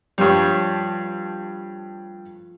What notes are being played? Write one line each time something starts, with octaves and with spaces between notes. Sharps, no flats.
G2 F3 G3 A3 C#5